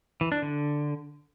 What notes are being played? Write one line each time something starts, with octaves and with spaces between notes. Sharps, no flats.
E3
D4
D3